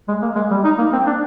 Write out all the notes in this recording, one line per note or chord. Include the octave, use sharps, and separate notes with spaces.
G#3
A#3
G#3
G3
D#4
A#3
C4
D4